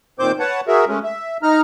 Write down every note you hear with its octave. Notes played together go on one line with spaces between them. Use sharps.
A#2 D#3 C4 C5 D6 G6
B4 C#5 F#5 A5
F#4 G#4 A#4 E5
G#3 A3 C#4
E5
D#4 A#5 F6